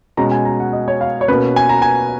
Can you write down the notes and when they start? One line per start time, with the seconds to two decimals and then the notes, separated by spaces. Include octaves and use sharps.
0.17 B2 G#3 C#4 A#5
0.31 G#5
0.45 A#5
0.60 F#5
0.73 D#5
0.88 C#5
1.01 F5
1.21 C#5
1.28 B2 A#3 C#4 B4
1.56 G#5
1.69 A#5
1.82 G#5